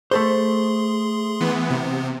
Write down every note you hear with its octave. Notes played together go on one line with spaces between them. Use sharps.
A3 G#4 A4 C5 C6
E3 B3
C3 B3